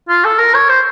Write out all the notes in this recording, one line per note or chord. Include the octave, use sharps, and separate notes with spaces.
F4
A4
A#4
C#5
C5